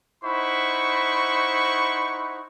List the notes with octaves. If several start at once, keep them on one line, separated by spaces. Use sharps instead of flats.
D#4 E4 C5 F#5 B5 C#6